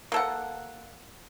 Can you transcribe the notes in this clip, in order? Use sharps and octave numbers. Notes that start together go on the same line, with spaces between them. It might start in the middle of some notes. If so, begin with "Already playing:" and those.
A#3 A4 F#5